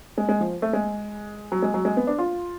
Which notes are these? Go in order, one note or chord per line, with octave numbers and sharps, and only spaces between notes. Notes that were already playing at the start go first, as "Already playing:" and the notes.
G#3
G#3
F3
A3
G#3
F#3
G#3
F#3
G#3
B3
D4
F4